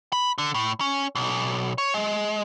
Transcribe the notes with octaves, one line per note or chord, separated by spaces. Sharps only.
B5
D3
A2
C#4
B1
C#5
G#3